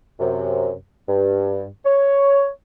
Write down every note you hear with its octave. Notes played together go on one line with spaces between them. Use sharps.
F#2 C3
G2
C#5